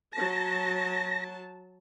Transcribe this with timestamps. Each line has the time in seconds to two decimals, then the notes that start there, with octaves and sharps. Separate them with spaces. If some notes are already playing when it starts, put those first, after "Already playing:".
0.13 F#3 A5 A#6